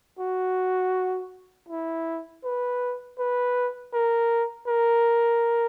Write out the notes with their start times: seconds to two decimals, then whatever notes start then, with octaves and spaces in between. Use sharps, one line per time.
0.20 F#4
1.69 E4
2.44 B4
3.18 B4
3.93 A#4
4.68 A#4